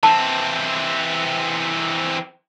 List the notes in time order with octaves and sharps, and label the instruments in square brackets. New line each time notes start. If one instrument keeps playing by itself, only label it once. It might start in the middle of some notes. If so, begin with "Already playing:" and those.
[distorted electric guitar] E3 C4 [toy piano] A5